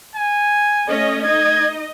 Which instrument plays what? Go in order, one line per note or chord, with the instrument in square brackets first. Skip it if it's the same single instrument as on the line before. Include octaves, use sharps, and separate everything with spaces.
[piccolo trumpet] G#5
[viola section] A3 C#4 D#5
[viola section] D#4 D#5 [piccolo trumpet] G#6